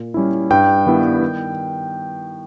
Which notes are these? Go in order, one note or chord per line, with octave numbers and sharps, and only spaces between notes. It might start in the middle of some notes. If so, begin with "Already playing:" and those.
Already playing: A#2
G3 C#4 E4
G2 G5
D#3 G3 B3 E4
D#3